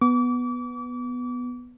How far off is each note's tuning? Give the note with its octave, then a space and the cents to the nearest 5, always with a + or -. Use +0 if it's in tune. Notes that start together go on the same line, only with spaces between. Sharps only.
B3 +0 D6 -35